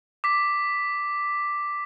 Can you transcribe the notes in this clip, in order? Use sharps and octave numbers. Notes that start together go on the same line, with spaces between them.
D6 B6